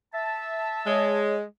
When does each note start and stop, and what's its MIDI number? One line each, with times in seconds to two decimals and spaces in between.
0.14 1.20 76
0.14 1.20 81
0.87 1.43 56
0.87 1.34 73